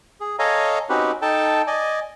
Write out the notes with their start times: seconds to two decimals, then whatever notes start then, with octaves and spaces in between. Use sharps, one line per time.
0.20 G#4
0.39 A4 C#5 D#5 F5 G#5 A#5
0.89 C4 C#4 D#4 F#4 G4 B4
1.22 D#4 A4 G5 A5
1.67 D5 D#5 G#5